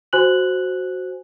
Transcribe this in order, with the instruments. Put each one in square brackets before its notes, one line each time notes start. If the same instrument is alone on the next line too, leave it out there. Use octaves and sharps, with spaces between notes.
[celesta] F#4 C5 G#5 F#6 F#7